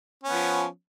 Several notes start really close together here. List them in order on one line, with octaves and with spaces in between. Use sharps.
C#4 B3 F3